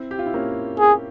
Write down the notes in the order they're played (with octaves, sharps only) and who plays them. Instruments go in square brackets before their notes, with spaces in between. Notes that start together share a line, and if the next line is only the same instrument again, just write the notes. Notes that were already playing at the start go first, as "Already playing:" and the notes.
Already playing: [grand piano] C4 E4
G4
F4
E4
A#3 C#4
[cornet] G#4